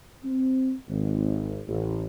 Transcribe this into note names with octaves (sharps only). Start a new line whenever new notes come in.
C4
G#1
A1